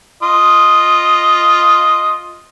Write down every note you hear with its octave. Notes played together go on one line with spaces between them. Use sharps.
F4 D#5